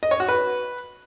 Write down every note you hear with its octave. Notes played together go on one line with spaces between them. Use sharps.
D#5
C#5
F#4
B4